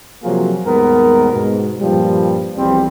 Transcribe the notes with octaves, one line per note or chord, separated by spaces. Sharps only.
C3 F3 F#3 A#3 F4 G#4
D#2 G#2 G3 B3 A#4
G#2 B2
G2 A#2 F3 G3
B1 E2 F3 G3 C4